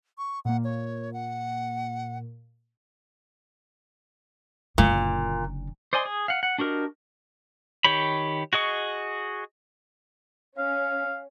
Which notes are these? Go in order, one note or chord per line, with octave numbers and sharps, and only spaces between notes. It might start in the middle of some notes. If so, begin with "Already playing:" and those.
C#6
A#2 A#3 F#5
C#5
F#5
F#1 A#2 D3
C5 D5 D#5 G#5 C6
G#4
F5 F#5
F#5
D4 F#4 G4 A#4 D#5
D#3 G4 C#5 B5
F#4 G#4 D#5 C#6
C#4 F5